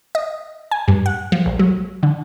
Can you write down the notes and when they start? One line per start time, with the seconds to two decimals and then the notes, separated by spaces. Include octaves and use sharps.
0.15 D#5
0.71 G#5
0.88 G2
1.06 F#5
1.32 F3
1.46 A#1
1.59 F#3
2.03 D3